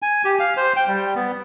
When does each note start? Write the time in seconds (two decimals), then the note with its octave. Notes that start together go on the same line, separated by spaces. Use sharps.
0.02 G#5
0.25 G4
0.40 F5
0.57 C5
0.76 G5
0.88 G3
1.15 B3